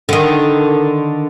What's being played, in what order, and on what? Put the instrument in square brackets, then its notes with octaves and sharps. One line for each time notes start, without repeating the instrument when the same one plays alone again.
[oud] D3 D#3